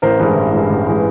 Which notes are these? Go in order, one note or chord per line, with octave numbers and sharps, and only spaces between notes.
A1 A#4 C5
G2 E3 G#3
A1
G2 E3 G#3
A1
E3 G#3